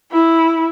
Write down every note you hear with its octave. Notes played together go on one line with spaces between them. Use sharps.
E4